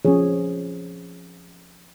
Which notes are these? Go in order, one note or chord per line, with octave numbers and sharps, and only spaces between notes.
F3 C#4 G#4 C#5